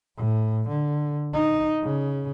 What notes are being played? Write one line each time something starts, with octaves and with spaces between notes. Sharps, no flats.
A2
D3
D#4
C#3